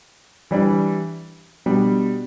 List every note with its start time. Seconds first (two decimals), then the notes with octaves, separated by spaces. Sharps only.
0.51 E3 G3 D4
1.66 B2 G3 D4